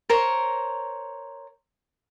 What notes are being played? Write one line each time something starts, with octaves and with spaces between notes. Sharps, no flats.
A#4 C5 C#5